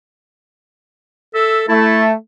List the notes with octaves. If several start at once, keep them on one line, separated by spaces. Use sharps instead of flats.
A4 E5
A3 E4 A5